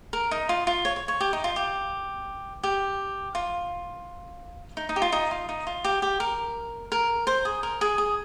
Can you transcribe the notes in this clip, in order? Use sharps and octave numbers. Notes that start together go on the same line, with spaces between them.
A#4
D#4
F4
F4
C#5
C#5
C#5
G4
D#4
F4
G4
G4
F4
D#4
D#4
G4
F4
D#4
F4
D#4
F4
G4
G4
A#4
A#4
C5
G#4
A#4
G#4
G#4